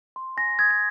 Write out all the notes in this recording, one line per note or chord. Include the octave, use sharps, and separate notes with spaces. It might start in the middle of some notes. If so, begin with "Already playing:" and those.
C6
G#5 A#6
D#6 G#6
G#6